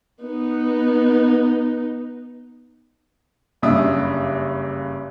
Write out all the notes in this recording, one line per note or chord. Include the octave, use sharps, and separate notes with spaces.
B3 D#4
F#1 G2 C#3 D4 E5 D#6